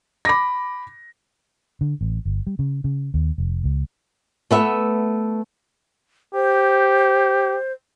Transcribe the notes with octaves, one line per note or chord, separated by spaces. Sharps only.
B5 D6 A#6
D3
A1
G1
G3
C#3
C#3
D#2
F1
C#2
A3 B3 E5
G4 C5